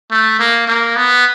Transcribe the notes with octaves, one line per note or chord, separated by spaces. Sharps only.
A3
A#3
A#3
B3